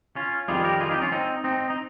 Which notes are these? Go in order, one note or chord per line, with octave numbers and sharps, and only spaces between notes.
C#4 F4
F2 D#3 G3 F4 G#4
G4 A#4
F4 G#4
D#4 G4
C#4 F4
C4 D#4
C4 D#4
D#4